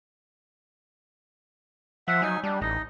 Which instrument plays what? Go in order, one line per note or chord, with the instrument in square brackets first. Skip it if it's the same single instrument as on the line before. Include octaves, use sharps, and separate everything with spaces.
[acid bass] F3 [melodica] E5 F#5
[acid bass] F#3 [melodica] D#4 G#5
[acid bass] G3 [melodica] D4
[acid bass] A1 [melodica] D#4 D#5